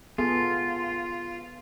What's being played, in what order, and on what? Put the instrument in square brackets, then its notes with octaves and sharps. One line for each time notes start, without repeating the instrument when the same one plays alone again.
[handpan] B3 G#4 A4 [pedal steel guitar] F4